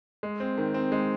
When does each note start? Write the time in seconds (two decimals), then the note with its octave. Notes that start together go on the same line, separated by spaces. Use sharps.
0.23 G#3
0.40 C4
0.58 D#3
0.74 C4
0.92 G#3